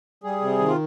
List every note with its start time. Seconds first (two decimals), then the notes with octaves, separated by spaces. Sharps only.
0.24 G3 G#4
0.41 C3
0.59 D#3
0.68 F4